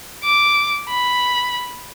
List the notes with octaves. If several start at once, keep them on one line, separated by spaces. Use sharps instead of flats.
D6
B5